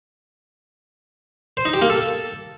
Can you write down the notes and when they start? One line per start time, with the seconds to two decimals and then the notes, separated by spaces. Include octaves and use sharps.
1.57 C5
1.65 D#4
1.74 G4
1.82 A#3
1.90 A4